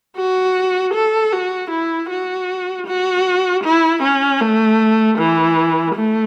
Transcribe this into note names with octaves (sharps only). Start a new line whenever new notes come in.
F#4
A4
F#4
E4
F#4
F#4
E4
C#4
A3
E3
A3